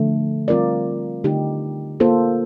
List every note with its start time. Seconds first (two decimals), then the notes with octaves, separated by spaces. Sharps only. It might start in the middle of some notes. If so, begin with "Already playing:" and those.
Already playing: D3 F3 A3
0.48 G3 C4 F4 A#4 D5
1.24 D3 A3 D#4 G4
2.00 A#3 F4 A4 C5